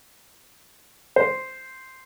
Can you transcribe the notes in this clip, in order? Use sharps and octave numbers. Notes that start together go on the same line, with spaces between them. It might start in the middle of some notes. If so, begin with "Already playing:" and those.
C5